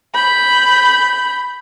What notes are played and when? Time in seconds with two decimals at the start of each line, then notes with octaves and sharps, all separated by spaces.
0.13 B5 G6